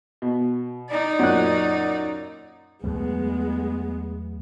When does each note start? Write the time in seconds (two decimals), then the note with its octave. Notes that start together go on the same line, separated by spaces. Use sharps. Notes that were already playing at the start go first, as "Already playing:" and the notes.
0.22 B2
0.90 D#4 D5
1.19 F#2 A#2 F#6
2.84 E2 F#3 G#3 A3 B3